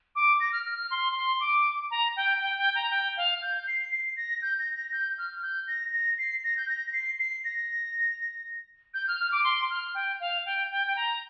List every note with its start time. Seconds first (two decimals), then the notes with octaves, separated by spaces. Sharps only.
0.16 D6
0.40 A#6
0.53 F6
0.65 F6
0.78 F6
0.91 C6
1.15 C6
1.40 D6
1.91 A#5
2.16 G5
2.41 G5
2.58 G5
2.75 A#5
2.91 G5
3.17 F5
3.42 G6
3.67 C7
3.92 C7
4.17 A#6
4.42 G6
4.59 A#6
4.75 A#6
4.92 G6
5.18 F6
5.42 G6
5.67 A#6
5.93 A#6
6.18 C7
6.44 A#6
6.57 G6
6.69 A#6
6.93 C7
7.19 C7
7.44 A#6
8.94 G6
9.08 F6
9.19 F6
9.32 D6
9.44 C6
9.70 F6
9.95 G5
10.20 F5
10.46 G5
10.71 G5
10.87 G5
10.96 A#5